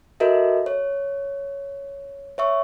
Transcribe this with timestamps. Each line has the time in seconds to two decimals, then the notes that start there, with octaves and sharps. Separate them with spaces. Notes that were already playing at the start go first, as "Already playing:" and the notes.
0.20 F#4 A4 A#4 D#5 E5
0.66 C#5
2.38 C#5 E5 C#6